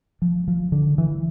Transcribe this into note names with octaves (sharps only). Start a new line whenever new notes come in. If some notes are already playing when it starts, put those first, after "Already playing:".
F3
F3
D3
E3